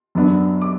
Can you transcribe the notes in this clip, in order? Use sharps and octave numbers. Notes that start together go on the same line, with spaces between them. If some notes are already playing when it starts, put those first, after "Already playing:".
F#2 F#3 B3 D4
D6